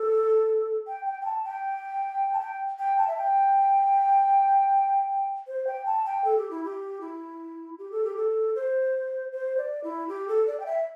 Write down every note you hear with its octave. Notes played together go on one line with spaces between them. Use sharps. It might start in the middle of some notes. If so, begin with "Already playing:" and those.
Already playing: A4
G5
G5
G5
A5
G5
A5
G5
G5
A5
E5
G5
C5
G5
A5
G5
A4
G4
E4
G4
E4
G4
A4
G4
A4
C5
C5
D5
E4
G4
A4
D5
G5
E5